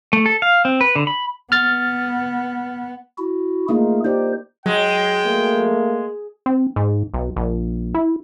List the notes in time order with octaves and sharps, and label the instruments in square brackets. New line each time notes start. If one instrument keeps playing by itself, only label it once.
[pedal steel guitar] A3
A4
F5
C4
B4
D3
B5
[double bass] B3 [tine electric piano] F6 A6
[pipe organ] E4 F#4
[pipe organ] A3 G#4 [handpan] A#3 D#4 F4
[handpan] D#4 G4 D5 [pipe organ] C5
[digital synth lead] F#3 [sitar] G#3 [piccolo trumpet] G5
[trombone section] A3 A#3
[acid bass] C4
G#2
B1
A#1
E4